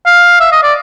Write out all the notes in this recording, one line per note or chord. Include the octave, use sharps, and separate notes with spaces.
F5
E5
D#5
D5